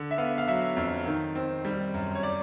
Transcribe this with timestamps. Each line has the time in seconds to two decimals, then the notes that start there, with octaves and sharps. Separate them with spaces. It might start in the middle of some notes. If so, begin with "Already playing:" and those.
Already playing: D3
0.11 E5
0.18 B3 F5
0.38 F5
0.47 F#3 E5
0.76 F2
1.06 D#3
1.35 C4
1.65 G3
1.94 F#2
2.15 C#5
2.23 D5